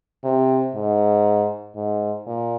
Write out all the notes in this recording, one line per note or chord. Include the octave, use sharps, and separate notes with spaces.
C3
G#2
G#2
A#2